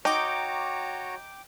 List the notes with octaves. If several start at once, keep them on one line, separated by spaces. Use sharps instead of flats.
D#4 F#4 C#5 G5 A#5 D6